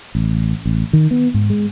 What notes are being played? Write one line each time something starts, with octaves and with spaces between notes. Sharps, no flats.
A1
A1
D#3
B3
G#2
G#3